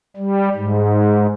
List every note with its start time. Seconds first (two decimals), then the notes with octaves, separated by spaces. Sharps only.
0.17 G3
0.55 G#2